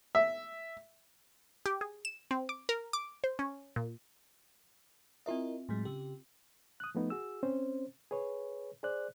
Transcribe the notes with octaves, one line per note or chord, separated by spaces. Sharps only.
E5
G4
G#4
E7
C4
D6
A#4
D6
C5
C#4
A#2
C4 E4 F4 A#4 D#5 E5
A2 F#3 G#3
C#3 G4
D#6 F#6
F3 A3 B3 D#4
F#4 G#4 E6
C4 C#4 C5
G#4 B4 C#5
G#4 C5 D5 F#6